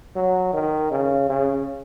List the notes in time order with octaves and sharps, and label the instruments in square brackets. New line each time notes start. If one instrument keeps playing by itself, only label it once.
[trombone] F#3
D#3
C#3
C#3